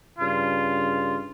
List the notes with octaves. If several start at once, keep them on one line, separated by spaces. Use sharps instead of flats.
G2 C#3 F4